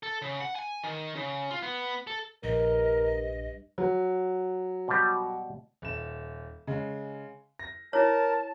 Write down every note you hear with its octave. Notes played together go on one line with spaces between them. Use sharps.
A4
C#3
F#5
G#5
D#3
C#3
F4
B3
A4
A#1 G2 A#4 D#5
F#3
B2 G3
D#1 E7
C#3 G#3
A#6
E4 A#4 C#5 A5